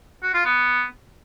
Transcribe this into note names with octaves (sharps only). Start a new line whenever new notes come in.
F#4
F4
B3